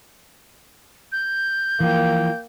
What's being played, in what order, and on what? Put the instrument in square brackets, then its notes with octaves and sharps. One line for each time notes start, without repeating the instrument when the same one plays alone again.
[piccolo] G6
[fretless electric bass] E3 F3 [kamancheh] A#3 G5